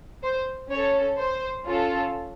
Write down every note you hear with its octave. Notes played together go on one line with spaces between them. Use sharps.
C5
C#4 A4 C#5
C5
C#4 F4 A4